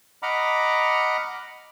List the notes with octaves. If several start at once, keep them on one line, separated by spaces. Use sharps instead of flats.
D#5 F#5 A#5 B5 D6 F6